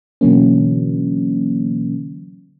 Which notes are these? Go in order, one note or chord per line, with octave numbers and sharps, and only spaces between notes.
B2 D3 E3 F#3 A#3 C#4